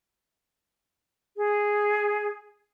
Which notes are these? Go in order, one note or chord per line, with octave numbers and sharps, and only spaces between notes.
G#4